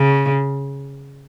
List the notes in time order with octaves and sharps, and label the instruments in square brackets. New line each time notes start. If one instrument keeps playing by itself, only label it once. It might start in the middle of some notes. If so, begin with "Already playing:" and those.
Already playing: [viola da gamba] C#3